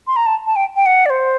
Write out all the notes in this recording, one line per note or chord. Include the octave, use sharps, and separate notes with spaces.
C6
A#5
A5
A5
G5
G5
F#5
D5
C5